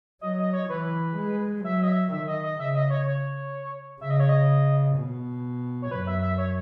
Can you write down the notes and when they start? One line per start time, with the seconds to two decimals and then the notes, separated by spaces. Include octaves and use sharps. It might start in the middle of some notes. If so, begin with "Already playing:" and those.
0.21 F#3 D#5
0.38 D#5
0.53 C#5
0.69 E3 B4
1.17 G#3
1.64 F#3 E5
1.83 D#5
1.88 E5
2.12 D#3 E5
2.27 D#5
2.43 D#5
2.59 C#3 E5
2.75 D#5
2.90 C#5
3.06 C#5
4.01 C#3 E5
4.10 D#5
4.20 C#5
4.29 D#5
4.96 B2
5.82 C#5
5.91 F#2 B4
6.07 E5
6.22 E5
6.38 C#5